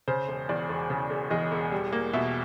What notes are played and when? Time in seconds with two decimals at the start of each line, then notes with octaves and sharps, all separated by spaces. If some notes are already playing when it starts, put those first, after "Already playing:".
0.08 C#3 C5
0.28 E1
0.49 E2 D5
0.69 E1
0.90 C#3
1.10 E1
1.31 E2 D#5
1.52 E1
1.72 G3
1.92 A#3
2.13 B2 E5